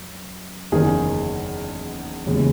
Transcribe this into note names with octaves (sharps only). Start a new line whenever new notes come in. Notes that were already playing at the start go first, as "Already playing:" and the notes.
Already playing: F#2
F#1 E2 D#3 G#4
E1 D#2 C#3 E3 G#3